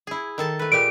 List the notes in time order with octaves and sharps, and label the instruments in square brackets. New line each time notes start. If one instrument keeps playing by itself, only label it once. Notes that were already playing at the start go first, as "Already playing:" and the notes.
[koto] E4 G#4
D#3 A4 A5
A3 B4
[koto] A#2 G#3 G4 [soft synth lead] D7